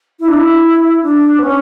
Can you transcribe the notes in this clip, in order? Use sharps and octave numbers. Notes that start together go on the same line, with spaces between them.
E4
D4
E4
D4
B3
C#4